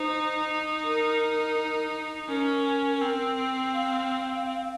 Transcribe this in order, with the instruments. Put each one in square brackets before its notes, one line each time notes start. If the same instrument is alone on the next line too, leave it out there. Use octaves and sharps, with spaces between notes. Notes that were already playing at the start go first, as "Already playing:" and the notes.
Already playing: [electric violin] D#4 [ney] C5
[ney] A#4
[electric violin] C#4 [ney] A#4
[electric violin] C4
[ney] F5